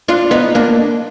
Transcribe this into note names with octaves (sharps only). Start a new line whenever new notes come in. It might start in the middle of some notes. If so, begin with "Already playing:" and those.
D4 F4
B3 D#4
A#3 D4